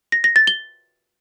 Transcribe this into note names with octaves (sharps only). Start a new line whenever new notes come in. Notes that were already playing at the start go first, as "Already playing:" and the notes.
A#6
A#6
A6
G7